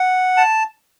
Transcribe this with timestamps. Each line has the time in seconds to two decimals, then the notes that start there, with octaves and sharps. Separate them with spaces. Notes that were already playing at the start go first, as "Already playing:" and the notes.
Already playing: F#5
0.37 A5